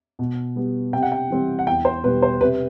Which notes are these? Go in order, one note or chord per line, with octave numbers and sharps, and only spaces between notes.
B2
G3 B3
C3 G5
F#5
G5
E3 G3 C4
F#5
E2 G5
C5
B2 G3 B4
C5
C3 B4